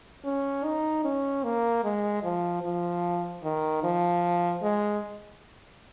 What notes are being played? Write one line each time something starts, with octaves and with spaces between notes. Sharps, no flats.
C#4
D#4
C#4
A#3
G#3
F3
F3
D#3
F3
G#3